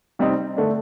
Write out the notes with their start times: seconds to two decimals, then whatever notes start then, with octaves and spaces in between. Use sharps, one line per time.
0.19 C3 G3 C4 D#4
0.57 D3 A3 D4